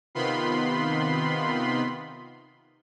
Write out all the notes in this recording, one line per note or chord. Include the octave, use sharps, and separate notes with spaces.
C3 D#3 B3 F4 B5 C6